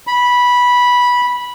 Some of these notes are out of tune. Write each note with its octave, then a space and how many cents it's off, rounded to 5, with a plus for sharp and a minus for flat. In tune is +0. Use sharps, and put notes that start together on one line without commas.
B5 -10